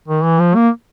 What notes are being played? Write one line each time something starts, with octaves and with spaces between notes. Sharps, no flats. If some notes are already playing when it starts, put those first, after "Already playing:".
D#3
E3
F3
A#3